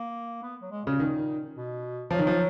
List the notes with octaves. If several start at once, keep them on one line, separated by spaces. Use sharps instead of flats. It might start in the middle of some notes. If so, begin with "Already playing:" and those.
Already playing: A#3
B3
F#3
G#3
A#2 C#3
D#3
B2
F3 F#3
D#3
F3